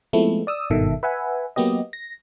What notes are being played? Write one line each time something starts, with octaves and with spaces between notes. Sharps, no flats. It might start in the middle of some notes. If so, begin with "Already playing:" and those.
F3 G#3 A3 B3 C4 E4
D5 D#6 E6
G#1 G2 B2 D#3 A4 E5
B4 E5 F#5 G#5
F#3 A#3 B3 G4 D#5
A#6